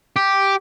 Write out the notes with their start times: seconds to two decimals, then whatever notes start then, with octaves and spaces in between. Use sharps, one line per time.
0.16 G4